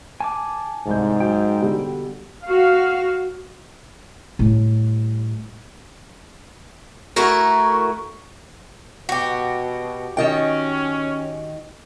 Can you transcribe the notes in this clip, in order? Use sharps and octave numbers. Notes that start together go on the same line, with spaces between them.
G#5 A5 D6
C2 G#2 G6
F#3 G5
B2 D3 G3
F#4 F5
A2 G3
A3 E4 F#4 A#4
B2 F#4 G4
D#3 C#4 D#5 G5